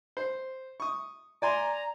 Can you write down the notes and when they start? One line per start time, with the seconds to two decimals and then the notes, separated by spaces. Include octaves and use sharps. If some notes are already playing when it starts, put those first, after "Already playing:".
0.17 C5
0.80 C#6 D#6
1.42 D5 G#5 A#5 C6